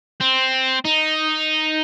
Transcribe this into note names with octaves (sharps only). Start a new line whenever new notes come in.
C4
D#4